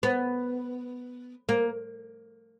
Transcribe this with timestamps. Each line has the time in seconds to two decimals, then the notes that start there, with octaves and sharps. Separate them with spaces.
0.03 B3
1.49 A#3